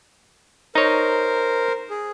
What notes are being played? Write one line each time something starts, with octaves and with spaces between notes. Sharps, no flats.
D#4 A#4 C5 C#5
G#4